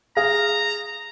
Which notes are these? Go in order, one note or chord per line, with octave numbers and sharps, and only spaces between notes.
G#4 F5 A#5